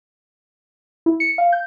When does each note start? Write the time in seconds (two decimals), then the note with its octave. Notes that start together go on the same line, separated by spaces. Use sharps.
1.06 E4
1.20 C#7
1.38 F5
1.53 G6